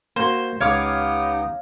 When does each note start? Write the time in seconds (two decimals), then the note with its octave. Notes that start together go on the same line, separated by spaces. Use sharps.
0.16 A#3 F#4 C5
0.60 C#2 B3 D#4 G4 C#5 F5 D6